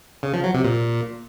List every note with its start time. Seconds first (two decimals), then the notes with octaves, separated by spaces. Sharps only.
0.23 C#3
0.33 F3
0.44 F#3
0.54 C3
0.64 A#2